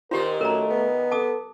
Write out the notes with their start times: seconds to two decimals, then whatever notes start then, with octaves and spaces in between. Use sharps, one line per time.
0.11 A#2 D#3 F4 G4 A#4 C5
0.41 F#2 A3 A#4 A#5
0.70 B3
1.11 A4 A5 D6 D#6